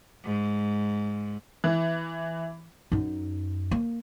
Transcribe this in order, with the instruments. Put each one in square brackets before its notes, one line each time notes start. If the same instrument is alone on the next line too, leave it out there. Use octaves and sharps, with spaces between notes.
[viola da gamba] G#2
[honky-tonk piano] E3
[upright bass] F#2 D#4
A#3